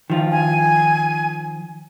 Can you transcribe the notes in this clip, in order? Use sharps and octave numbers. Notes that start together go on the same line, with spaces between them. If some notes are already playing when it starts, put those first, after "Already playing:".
D#3 F3 F4
G#5